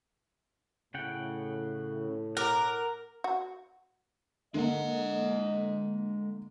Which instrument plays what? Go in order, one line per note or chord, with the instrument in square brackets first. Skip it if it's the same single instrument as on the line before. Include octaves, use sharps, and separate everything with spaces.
[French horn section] A2 [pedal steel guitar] C#3 F#5 G5
[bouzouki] A#4 [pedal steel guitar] F#5 D6
[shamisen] F#4
[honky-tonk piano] D3 A#3 [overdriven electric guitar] G#3 F#5 [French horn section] D#5